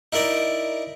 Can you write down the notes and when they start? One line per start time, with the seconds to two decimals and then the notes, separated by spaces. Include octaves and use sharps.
0.13 D#4 E4 A#4 D5 D#5